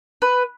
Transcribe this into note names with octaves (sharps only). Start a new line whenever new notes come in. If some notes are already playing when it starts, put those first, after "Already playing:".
B4